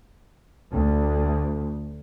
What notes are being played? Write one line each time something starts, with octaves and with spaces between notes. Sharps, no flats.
D2